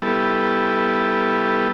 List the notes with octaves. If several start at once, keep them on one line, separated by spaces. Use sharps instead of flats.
G3 B3 E4 A4